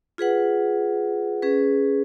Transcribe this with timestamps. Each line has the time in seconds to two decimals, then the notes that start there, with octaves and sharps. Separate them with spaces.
0.18 F4 G#4 B4 F#5
1.42 C#4 G#4 B4